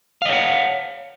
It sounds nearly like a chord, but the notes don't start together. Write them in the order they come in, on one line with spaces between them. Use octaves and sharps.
F5 D#5 C#5 F#5